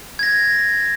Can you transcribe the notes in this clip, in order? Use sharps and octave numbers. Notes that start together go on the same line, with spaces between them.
G#6 A#6